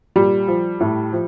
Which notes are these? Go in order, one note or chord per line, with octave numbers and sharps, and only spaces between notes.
A#2 G3
F3
A2
F3